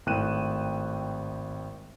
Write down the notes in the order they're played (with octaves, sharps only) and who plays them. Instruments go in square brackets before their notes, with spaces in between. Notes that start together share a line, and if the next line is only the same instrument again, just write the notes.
[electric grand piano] G#1 A2 G5 F#6 D#7 E7